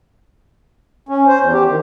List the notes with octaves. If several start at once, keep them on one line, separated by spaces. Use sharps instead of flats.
C#4
C5
E2
G4
D#3